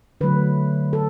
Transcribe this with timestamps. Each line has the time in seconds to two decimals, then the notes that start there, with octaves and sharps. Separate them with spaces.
0.21 D3 F#3 A3 B4
0.93 A4